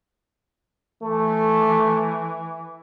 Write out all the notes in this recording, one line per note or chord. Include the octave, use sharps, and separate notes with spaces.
E3 A3